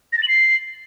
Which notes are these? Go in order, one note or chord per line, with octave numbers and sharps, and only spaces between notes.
A#6
A6
F#7
C7